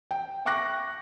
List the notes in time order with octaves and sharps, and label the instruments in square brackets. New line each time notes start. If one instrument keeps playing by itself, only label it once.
[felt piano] G5
E5 G5 C#6 D6 F#6 A#6